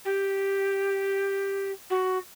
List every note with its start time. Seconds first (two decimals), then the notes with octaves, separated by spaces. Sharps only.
0.04 G4
1.89 F#4